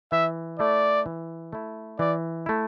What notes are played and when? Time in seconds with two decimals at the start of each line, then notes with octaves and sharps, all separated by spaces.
0.12 E3 E5
0.59 A3 E4 D5
1.06 E3
1.53 A3 E4
1.99 E3 D5
2.46 A3 E4